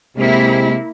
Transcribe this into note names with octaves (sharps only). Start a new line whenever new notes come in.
C3 G#3 A#3 E4